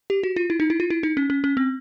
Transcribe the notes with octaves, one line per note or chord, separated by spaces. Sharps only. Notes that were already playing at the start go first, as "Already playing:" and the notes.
G4
F#4
F4
E4
D#4
E4
F4
E4
D#4
C#4
C#4
C#4
C4